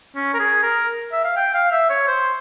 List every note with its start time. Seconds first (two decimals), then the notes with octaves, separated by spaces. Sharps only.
0.16 C#4
0.34 A#4
0.39 G#4
0.63 A#4
1.12 E5
1.24 F5
1.36 G5
1.54 F5
1.71 E5
1.90 C#5
2.08 C5